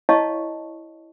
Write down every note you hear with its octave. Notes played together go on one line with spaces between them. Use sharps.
E4 C#5 D#5 F5 A5 C#6